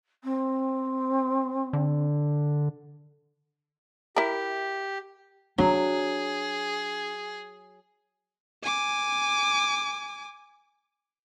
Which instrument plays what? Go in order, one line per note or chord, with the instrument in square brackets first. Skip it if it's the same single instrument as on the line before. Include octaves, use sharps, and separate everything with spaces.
[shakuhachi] C4
[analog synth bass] D3
[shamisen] E4 A#4 [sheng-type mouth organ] G4
[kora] F#3 [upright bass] D4 [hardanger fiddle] G#4
[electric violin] G#5 D6